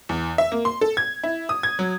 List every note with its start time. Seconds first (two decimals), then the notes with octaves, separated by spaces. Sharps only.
0.09 E2
0.38 E5
0.52 A#3
0.65 C6
0.81 A4
0.97 G#6
1.24 E4
1.49 D#6
1.63 G#6
1.79 F#3